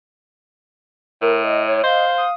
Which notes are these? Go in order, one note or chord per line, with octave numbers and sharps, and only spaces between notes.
A2 A#4
D#5
C#5
C5 D#5 F5
D#6